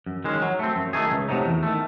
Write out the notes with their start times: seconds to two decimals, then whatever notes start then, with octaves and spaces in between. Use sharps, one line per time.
0.06 F#2
0.24 D#3 G#3 C#4
0.42 F#3
0.59 A3 C4
0.76 F#2
0.93 D#3 A3 D#4 G#4
1.12 C#2
1.29 C3 F#3 A3 D#4
1.46 E2
1.63 D#3 A3